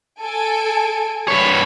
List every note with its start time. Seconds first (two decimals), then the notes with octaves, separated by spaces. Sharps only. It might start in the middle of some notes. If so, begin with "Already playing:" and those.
0.22 A4 G#5 D7
1.28 G2 C#5 B5